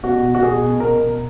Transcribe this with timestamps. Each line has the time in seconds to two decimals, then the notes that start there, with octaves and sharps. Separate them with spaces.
0.03 B2 F#4
0.22 B2
0.35 F#4
0.42 B2 G#4
0.62 B2
0.80 B2 A#4
0.99 B2